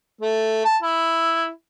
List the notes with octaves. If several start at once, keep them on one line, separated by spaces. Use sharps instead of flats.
A3
A5
E4